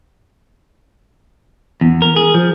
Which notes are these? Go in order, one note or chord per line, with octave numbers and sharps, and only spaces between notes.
E2
A#4
G#4
F3